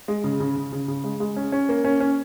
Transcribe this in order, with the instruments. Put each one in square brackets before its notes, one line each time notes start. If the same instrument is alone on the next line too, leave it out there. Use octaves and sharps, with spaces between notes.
[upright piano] G#3
C#3
C#3
C#3
C#3
C#3
G#3
G#3
C#4
C#4
A#3
C#4
C#4